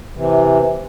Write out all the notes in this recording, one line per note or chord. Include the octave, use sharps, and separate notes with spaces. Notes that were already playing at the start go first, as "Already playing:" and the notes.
C3 E3